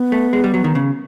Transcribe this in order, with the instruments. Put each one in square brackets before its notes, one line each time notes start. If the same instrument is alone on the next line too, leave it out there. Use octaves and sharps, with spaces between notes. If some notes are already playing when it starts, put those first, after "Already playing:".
Already playing: [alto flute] B3
[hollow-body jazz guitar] A3
G#3
G3
F#3
D#3
C#3